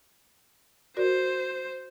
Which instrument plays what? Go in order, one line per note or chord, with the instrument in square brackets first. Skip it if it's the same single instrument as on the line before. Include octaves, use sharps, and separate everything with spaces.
[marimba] F#4 A#4 D5 [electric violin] C5